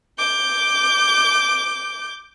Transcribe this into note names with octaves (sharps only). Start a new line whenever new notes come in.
D6 G6